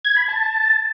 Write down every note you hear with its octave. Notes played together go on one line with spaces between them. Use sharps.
G#6
B5
A5